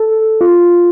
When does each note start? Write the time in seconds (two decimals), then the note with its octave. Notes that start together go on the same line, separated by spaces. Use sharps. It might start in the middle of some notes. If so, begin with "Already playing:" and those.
Already playing: A4
0.41 F4